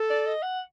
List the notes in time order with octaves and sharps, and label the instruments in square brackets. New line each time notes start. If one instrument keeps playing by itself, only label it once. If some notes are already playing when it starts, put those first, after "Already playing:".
Already playing: [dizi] A4
[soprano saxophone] D5
D#5
F#5